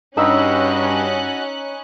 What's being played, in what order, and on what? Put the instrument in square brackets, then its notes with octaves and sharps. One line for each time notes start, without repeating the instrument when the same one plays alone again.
[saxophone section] G2 [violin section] C#4 F#6 [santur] D#4 B5 E6 [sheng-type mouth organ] F#4 D#5